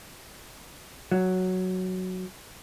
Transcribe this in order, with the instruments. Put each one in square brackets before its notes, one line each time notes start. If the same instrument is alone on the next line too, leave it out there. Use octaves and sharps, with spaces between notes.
[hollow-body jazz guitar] F#3